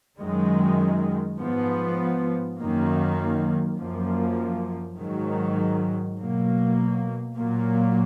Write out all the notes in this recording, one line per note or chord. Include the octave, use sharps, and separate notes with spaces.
F#2 D#3 G#3
G#2 F3 B3
F#2 D#3 A#3
F#2 F3 A#3
G#2 D#3 F#3
B2 F#3 A#3
A#2 F#3 A#3